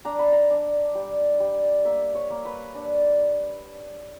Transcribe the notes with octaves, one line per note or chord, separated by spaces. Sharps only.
D4 A#5
B5
A#5
D4
G3
G3
A#3 E5
C#5
A#3
B4
D4